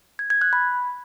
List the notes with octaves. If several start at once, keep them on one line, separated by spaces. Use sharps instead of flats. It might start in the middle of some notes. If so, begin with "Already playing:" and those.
G#6
G#6
F#6
B5